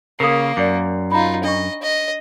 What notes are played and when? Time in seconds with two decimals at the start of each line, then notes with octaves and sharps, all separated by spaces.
0.20 C#3 A#3 A#4 D#6
0.57 F#2 D5 D6
1.12 D#4 F4 A#5 B5
1.44 D4 D#5 G5 C#6
1.82 D#5